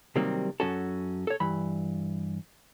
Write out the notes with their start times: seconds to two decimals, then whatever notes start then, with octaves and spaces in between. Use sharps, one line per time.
0.16 C3 D#3 F#3 G3 A#3 C4
0.60 F#2 C#4 F#4 A4
1.27 A4 C#5
1.40 G2 E3 B5